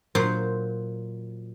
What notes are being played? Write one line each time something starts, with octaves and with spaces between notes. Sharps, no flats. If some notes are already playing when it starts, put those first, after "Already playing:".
A#2 F#3 C5